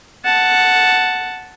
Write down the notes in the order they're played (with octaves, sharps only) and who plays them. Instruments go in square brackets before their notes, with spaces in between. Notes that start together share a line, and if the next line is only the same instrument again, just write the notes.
[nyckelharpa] F#5 A5